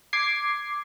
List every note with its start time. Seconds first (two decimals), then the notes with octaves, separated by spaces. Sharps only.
0.13 D6 G#6 C7